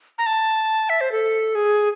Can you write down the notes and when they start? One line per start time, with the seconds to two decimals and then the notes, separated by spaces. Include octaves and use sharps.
0.18 A#5
0.26 A5
0.90 E5
1.01 C5
1.12 A4
1.55 G#4